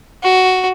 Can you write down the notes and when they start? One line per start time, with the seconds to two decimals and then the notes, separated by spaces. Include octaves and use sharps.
0.23 F#4